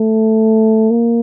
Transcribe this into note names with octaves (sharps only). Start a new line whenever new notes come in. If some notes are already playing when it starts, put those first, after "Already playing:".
Already playing: A3
A#3